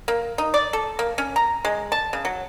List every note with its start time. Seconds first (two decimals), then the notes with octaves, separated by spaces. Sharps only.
0.08 A#3
0.38 D#4
0.54 D5
0.73 A4
0.99 A#3
1.18 C#4
1.36 A#5
1.65 G#3
1.92 A5
2.13 C#3
2.25 F#3